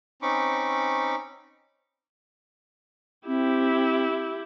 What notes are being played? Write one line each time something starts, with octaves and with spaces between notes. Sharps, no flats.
C4 C#4 D#4 B5 C#6 D6
C4 E4 G4